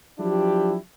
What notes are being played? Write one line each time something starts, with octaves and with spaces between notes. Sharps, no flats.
F3 F#3 D4 E4 G4